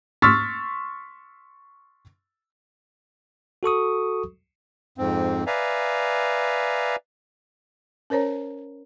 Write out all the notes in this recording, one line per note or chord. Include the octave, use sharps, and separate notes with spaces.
C6 C#6 E6 F6 A6 B6
F#4 A4 C#6 D#6
F2 G#2 C4
B4 D5 E5 F5 G#5 A#5
C#4 A#4 C5 C#5 A#5